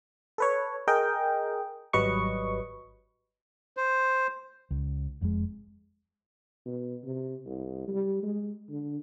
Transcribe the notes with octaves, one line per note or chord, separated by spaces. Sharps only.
A4 B4 C#5
G#4 A#4 D#5 G5
G#1 F#3 G3 B4 D#5 C#6
C5
C#2
F1 F2 A#2 G#3
B2
C3
C2
G3
G#3
D3